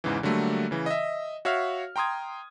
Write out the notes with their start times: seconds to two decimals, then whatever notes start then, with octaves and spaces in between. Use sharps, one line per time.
0.04 E2 G#2 C#3 E3
0.23 D3 F#3 G3 A3 A#3
0.71 C#3 E3
0.86 D#5 E5
1.45 F#4 C#5 E5 F5 F6
1.96 G5 A#5 C6 D#6 G#6